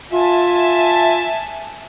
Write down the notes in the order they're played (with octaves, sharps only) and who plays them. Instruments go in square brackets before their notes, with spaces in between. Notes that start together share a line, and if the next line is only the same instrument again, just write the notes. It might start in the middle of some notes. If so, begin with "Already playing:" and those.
[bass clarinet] F4 [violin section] E5 G#5 A5